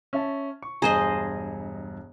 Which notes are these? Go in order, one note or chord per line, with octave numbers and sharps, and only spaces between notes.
C#4 E5 A5
C#6
E1 G2 G#4 C5 D#5 A#5